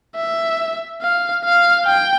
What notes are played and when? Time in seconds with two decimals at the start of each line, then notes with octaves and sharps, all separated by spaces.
0.15 E5
1.02 F5
1.44 F5
1.86 G5